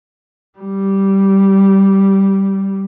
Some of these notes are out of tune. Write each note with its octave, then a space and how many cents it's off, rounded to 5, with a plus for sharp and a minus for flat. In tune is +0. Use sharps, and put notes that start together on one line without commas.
G3 -10